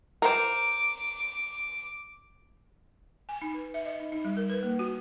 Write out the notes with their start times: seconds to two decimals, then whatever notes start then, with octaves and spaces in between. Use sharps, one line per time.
0.22 A#4 C5 D6
3.29 G#5
3.42 D#4
3.54 B4
3.74 E5
3.85 D#5
4.00 D#4
4.12 D#4
4.25 G3
4.37 A#4
4.50 B4
4.63 A#3
4.79 F#4